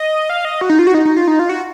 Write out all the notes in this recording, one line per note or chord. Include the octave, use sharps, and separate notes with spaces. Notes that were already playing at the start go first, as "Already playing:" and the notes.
Already playing: D#5
F5
D#5
F#4
D#4
F4
F#4
D#4
D#4
F4
D#4
F4
F#4